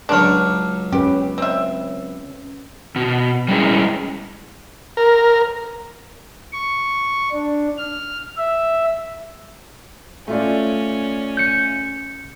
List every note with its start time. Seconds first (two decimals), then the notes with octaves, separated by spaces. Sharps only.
0.09 C#2 F#3 D4 A#4 C#5
0.93 C#4 G4 B4
1.38 C4 E5
2.96 B2
3.48 G3 G#3 C#4 E4 G#4
4.97 A#4
6.52 C#6
7.32 D4
7.78 F6
8.37 E5
10.28 A3 C#4 F4 D5
11.37 G6 C#7